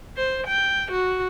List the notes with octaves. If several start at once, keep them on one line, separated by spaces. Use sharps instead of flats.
C5
G5
F#4